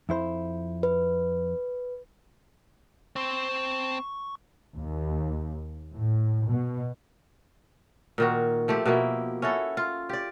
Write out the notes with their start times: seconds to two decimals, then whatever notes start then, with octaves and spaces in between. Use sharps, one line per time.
0.09 F2 E4 C5
0.83 B4
3.16 C4 C5 A5 C#6
4.76 D#2
5.92 A2
6.45 B2
8.18 A#2 D#3 F#4
8.68 F3 A3 C4 G4
8.85 B2 F3 A#3 E4
9.42 C#4 E4 F#4 A4
9.77 F4
10.09 G4 D5